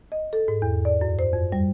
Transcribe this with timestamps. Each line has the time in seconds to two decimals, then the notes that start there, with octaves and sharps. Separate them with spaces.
0.12 D#5
0.33 A4
0.48 G#2
0.62 E2
0.85 D5
1.01 F#2
1.19 C5
1.33 F2
1.52 G3